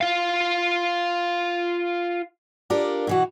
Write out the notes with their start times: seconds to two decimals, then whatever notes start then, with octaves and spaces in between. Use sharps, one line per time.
0.01 F4 F5
2.70 D4 F4 G4 A4 A#4
3.07 B2 E3 F#4